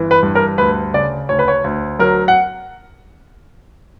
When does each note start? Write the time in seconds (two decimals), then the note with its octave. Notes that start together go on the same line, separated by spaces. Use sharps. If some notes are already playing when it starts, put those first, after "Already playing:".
Already playing: G1 E3
0.11 B4
0.23 G2
0.35 A#4
0.58 D2 B4
0.94 C#3 D5
1.29 D2 C#5
1.39 B4
1.48 C#5
1.64 D2
1.99 F#3 A#4
2.28 F#5